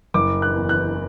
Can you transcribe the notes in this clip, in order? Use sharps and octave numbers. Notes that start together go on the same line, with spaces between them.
F#1 D6
F#6
E2
F#6